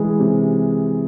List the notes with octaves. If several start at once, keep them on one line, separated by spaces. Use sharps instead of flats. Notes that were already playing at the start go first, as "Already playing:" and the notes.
Already playing: E3 G#3
C3